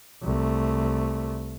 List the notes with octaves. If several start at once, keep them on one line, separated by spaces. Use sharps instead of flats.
C2 A3